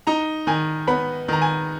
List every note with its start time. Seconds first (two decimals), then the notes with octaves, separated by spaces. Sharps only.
0.07 D#4 A#5
0.47 D#3 G#5
0.87 B3 B5
1.28 D#3 A#5
1.42 G#5